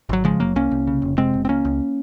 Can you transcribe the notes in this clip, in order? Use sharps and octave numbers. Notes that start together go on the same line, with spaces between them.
G#1 F#3
C#3 F3 G#3
F#1 F#3 A#3
C2 A#3 C#4
C2
C#3
F1
C3 G#3 C4
F#1
C4
C#2 A#3 C#4
C#2